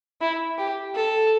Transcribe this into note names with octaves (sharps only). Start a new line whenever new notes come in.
E4
G4
A4